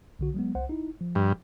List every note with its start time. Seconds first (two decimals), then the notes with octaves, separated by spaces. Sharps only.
0.19 B1 D3 F#4
0.34 F#3 G#3 B3
0.55 C2 C5 F#5
0.69 D#4 E4
1.01 F3
1.15 G2